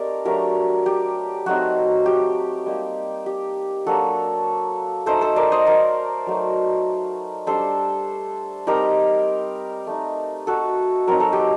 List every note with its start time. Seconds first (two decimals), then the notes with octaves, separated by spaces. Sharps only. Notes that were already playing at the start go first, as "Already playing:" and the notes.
Already playing: A3 C4 D#4 G4 A#4 D5
0.25 F#3 A3 D4 G4 A#4
0.86 G4
1.46 F#3 A3 C4 D#4 F#4
2.06 G4
2.66 G3 A#3 D#4
3.26 G4
3.86 F#3 A#3 D4 F#4 A4
5.06 A3 D#4 A4 C5
5.21 A4 C5
5.36 A#4 D5
5.52 C5 D#5
5.66 A#4 D5
6.27 F#3 A3 D#4
7.47 G3 D4 A4 C5
8.67 G3 C4 D#4 G4 A#4
9.87 A3 D#4
10.47 F#4 A4
11.07 F#3 C4 D#4 A#4
11.20 A4
11.33 G4